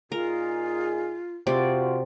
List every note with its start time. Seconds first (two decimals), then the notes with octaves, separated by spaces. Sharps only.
0.12 A#2 D#4 F4 G#4 A#4
1.47 C3 F4 F#4 D5